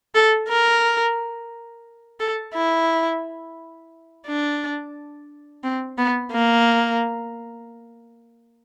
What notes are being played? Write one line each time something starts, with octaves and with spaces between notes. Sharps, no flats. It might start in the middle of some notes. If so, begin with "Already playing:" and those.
A4
A#4
A4
E4
D4
C4
B3
A#3